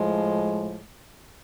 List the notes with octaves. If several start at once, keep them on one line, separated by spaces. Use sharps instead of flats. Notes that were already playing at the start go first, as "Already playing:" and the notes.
Already playing: A2 F3 G#3